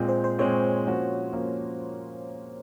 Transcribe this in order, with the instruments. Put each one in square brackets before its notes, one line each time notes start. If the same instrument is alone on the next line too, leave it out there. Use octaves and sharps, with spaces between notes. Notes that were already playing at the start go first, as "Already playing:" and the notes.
Already playing: [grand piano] A#2 G#3 C4
[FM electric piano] C5
C5
[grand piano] A#2 G#3 C4 [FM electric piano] C#5
[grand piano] F3 A#3 C#4 F#4
F3 A#3 C#4 F#4